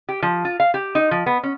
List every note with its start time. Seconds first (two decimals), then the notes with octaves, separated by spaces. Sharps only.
0.09 G4
0.22 F3
0.45 F4
0.60 F5
0.74 G4
0.95 D#4
1.11 F3
1.26 B3
1.43 C#4